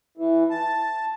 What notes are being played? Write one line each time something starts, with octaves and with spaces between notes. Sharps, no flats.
E3
A5